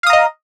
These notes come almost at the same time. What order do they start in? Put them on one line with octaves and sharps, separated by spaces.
F5 D#6 A#5 D#5